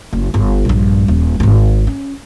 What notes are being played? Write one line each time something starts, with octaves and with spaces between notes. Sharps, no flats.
F#1
G1
A#1 G2
D#1
D1 G#1
C#4